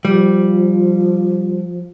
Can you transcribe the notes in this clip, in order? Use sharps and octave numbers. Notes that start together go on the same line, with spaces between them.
F3 G3